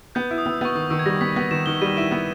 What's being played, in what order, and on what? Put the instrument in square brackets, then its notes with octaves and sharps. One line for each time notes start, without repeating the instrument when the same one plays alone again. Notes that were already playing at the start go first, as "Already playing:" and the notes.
[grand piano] B3 [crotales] G6
[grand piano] E4
[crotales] D#6
[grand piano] B3 [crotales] E6
[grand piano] B3 [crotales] C#6
[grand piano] D#3 [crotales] D#6
[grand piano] D#3 [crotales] E6
[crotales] G#6
[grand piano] G3 [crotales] A#6
[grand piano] B3 [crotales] B6
[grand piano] B3 [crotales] B6
[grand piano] D#3 [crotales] E7
[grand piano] D#3 [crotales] G7
[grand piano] G3 [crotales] D#7
[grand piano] E4 [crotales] E7
[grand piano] B3